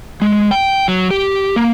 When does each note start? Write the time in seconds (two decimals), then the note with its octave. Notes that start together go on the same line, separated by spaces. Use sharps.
0.22 G#3
0.51 G5
0.88 F#3
1.11 G4
1.56 A#3